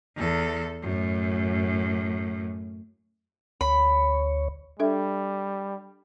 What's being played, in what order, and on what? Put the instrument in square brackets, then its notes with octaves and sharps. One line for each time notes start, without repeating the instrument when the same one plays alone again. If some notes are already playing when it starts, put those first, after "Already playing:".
[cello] E2 A4
F#2 A2
[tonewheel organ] D2 C#5 [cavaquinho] B5
[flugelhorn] G3 [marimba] D4 A4 E5